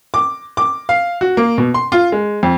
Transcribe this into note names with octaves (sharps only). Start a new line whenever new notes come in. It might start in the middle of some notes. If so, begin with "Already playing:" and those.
D6
D6
F5
F#4
A#3
B2
C6
F4
G#3
F2